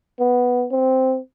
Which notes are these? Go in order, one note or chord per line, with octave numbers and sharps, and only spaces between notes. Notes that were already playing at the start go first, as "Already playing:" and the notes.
B3
C4